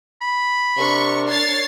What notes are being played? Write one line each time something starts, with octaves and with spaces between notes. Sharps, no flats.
B5
C3 D4 A#4 C#6
C#5 A6 C7